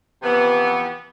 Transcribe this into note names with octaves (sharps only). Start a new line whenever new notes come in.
C3 E3 F3 B3